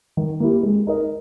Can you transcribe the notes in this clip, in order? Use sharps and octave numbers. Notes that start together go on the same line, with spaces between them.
D#3
A#3 E4 G4
G#3
D#4 A#4 D#5